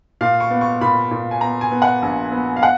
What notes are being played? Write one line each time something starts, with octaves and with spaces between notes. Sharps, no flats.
A#2 F5
C#6
B3
C#6
A#2 B5
A#2
G#5
B3 A#5
G#5
B3
F#5
A#1
B3
F5
F#5